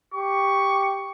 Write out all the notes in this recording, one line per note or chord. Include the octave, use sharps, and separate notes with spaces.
G4 C#6